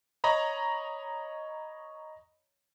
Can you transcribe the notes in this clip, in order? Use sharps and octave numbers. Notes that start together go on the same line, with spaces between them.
C#5 D#5 A#5 B5